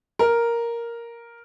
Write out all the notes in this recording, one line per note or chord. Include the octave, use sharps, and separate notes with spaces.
A#4